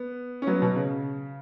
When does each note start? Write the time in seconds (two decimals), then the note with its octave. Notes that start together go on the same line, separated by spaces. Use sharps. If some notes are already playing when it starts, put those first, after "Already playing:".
Already playing: B3
0.42 C#4
0.47 F#3 B3
0.62 B2
0.76 C#3